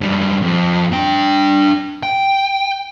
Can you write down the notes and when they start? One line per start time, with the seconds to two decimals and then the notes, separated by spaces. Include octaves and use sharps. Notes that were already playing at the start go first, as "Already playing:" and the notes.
0.01 F#2 G3
0.42 F2
0.92 D4 G5
2.03 G5